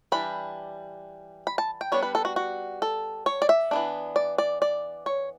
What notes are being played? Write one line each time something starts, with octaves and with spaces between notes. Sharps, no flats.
E3 G3 D4 B5
B5
A5
G5
G3 B3 D4 C#5
B4
A4
F#4
F#4
A4
C#5
D5
E5
E3 B3 D4
D5
D5
D5
C#5